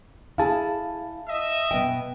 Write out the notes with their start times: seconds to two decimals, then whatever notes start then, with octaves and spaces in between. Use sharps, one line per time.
0.38 E4 G#4 A4 F5 A5
1.28 D#5 E5
1.71 B2 B3 G5